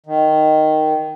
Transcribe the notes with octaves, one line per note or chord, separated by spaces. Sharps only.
D#3